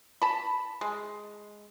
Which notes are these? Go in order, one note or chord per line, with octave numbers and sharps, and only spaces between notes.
A5 B5
G#3